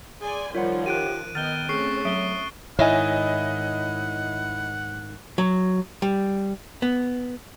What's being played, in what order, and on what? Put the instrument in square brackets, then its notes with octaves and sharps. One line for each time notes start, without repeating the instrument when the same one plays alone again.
[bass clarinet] G#4 [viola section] D5 G#5 C6
[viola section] D#3 F3 [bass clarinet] G3 [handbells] F4 C#5 F#5
[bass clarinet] G4 [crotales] F#6 D7 D#7
[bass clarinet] D#3 [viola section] B3 D#5 [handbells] F6 G6 [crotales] A6 G7
[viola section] A3 C4 C#4 [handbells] G#4 [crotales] C#6 C7
[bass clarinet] F#3 [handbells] E5 D#6 [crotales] D7 G7
[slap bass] G#2 D#3 [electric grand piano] E4 D#5 [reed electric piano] C#5 E5 G#5 [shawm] F#5
[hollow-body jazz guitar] F#3
G3
B3